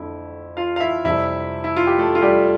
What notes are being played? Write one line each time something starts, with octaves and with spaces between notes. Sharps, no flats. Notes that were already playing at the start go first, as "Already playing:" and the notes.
Already playing: F2 D3 A3 E4
F4 F5
F5
E4 E5
F2 C3 G3 E4 E5
E4
F4
G4
A3 A4
F4
G3 G4